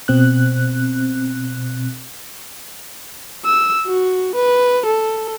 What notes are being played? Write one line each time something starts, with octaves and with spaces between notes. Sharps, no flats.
B2 C4 F#6
E6
F#4
B4
A4